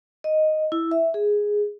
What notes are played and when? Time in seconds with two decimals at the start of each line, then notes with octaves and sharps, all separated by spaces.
0.24 D#5
0.72 E4
0.91 E5
1.14 G#4